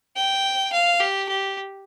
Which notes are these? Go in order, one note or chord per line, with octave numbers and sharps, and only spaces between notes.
G5
F5
G4
G4